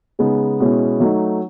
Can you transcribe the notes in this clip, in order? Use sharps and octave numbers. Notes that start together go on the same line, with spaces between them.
C#3 G#3 B3 D#4
B2 G#3 C#4 E4
F#3 A3 D#4